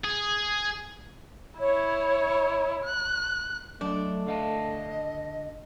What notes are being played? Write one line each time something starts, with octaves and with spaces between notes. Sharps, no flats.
G#4
E4 C#5
F#6
F#3 A3 D4 D#5
D3 D#5 F5 A5